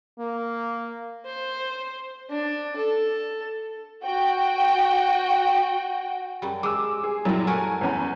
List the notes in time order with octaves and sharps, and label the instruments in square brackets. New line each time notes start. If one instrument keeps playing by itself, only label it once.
[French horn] A#3
[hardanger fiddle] C5
D4
A4
[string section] F#4 G5
[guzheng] F#2 G3
[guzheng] G#3 [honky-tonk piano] D6 E6
[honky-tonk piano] G#4
[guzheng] F#2 A#2 [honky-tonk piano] F#3 G3 E4
[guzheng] A3 F#4 A#4 [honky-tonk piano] G#5
[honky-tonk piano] E2 C#4 B5